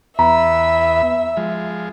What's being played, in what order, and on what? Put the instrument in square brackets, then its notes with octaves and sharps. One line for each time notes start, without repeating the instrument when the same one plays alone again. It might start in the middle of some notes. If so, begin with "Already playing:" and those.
[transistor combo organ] E2 B3 B5 [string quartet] E5 [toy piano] A#5
[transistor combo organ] F3 G#3